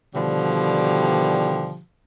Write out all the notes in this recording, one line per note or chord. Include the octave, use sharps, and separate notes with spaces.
B2 D3 D#3 F3 G3 G4